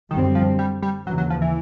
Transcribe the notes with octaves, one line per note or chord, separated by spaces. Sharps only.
F#2 D3 D#3 G3 C4
F3
G3
G3
D#2 C#3 E3 F#3
F#3
F3
E3